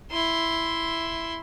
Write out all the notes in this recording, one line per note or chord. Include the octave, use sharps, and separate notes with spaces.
E4 C6